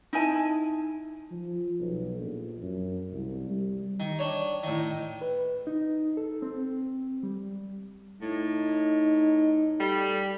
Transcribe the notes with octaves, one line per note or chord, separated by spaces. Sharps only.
D#4 E4 G#5 A5
F3
B1
A#1
F#2
C2
G3
D#3
D4 C#5
A2 D#3
B4
D#4
A4
C4
G3
A2 D#4
G3 A4